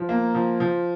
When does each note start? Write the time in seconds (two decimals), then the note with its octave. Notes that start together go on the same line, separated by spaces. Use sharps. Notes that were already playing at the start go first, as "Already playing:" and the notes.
Already playing: F3
0.09 A#3
0.35 F3
0.60 F3